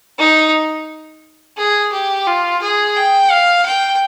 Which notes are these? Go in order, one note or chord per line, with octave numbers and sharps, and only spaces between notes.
D#4
G#4
G4
F4
G#4
G5
F5
G5